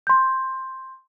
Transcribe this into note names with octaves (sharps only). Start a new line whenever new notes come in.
C6 G6